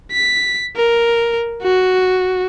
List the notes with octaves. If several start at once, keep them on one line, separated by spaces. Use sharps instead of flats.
B6
A#4
F#4